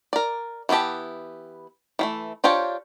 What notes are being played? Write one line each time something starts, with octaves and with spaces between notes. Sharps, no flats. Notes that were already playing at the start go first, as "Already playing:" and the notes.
A#4 D5
E3 B3 E4 G4 A5
E3 G3 A3
D4 F4 G4 C5 C#5